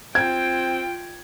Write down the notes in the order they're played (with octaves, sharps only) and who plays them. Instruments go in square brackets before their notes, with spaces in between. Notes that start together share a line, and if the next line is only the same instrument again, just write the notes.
[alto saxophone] C4 [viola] F4 G5 [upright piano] G#6